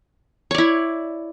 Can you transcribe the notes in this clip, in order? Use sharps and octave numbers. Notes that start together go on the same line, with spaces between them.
E4 C#5 D5